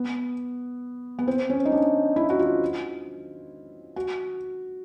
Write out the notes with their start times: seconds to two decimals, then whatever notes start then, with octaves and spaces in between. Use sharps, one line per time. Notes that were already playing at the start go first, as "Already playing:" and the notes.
Already playing: B3
1.19 B3
1.28 C4
1.50 C#4
1.65 D#4
1.72 D4
2.16 E4
2.30 F#4
2.39 F4
3.96 F#4